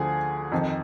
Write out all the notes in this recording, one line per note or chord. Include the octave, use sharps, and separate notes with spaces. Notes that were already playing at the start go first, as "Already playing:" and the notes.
Already playing: D2 D3 F3 G#4
F2 D#3